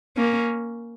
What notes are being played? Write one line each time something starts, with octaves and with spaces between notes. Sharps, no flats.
A#3 C#4